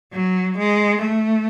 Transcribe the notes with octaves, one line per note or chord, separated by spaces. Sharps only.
F#3
G#3
A3